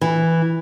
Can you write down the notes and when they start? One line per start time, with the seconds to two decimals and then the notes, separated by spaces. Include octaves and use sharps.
0.01 E3